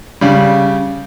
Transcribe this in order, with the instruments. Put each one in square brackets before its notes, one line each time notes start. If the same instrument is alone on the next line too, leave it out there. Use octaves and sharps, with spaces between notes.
[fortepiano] C#3 G3